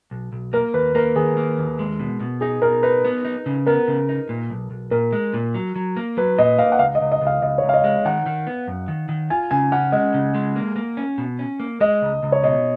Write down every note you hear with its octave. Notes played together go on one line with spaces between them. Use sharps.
B1
B1
A#3 A#4
D#2 B4
A#3 A#4
D#3 G#4
A#3
D#2
G#3
B2
B2
D#4 G#4
B2 A#4
D#4 B4
B3
D#4
C#3
B3 A#4
C#3
D#4
A#2
B1
B1
A#2 A#4
G#3
A#2
F#3
F#3
A#3
F#3 B4
A#2 D#5
A#3 F5
F#5
C#2 F5
D#5
C#2
D#5
C#2
F5
C#2 D#5
C#5
C#2
F5
D#5
G#3
D#3 F#5
D#3
B3
F#2
D#3
D#3
F4 G#5
C#3 G#5
C#4 F#5
G#3 D#5
C#3
G#3
A#3
A#3
C#4
B2
C#4
A#3
G#3 D#5
C#2
C#2
C#5
B2 D#5